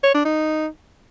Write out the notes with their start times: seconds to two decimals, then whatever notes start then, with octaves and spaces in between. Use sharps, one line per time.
0.04 C#5
0.15 D4
0.25 D#4